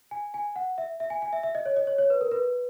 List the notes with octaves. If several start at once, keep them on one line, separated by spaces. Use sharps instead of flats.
G#5
G#5
F#5
E5
E5
G#5
G#5
E5
E5
D#5
C#5
D#5
C#5
C#5
B4
A#4
B4